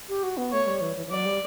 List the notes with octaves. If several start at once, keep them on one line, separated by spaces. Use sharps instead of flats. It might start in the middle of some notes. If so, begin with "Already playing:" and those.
G4
F#4
B3
A3 C#5
G3
E3
E3
E3
F#3 D5
G3